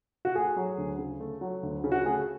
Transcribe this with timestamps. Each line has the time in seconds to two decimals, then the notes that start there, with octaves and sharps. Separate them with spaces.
0.25 F#4
0.35 A3 G#4
0.56 F#3
0.78 D2
0.99 C#3
1.20 A3
1.41 F#3
1.63 D2
1.84 C#3
1.92 F#4
2.05 A3 G#4